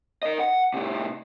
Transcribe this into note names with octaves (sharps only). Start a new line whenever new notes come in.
A#4 D#5
F#5
A2 C3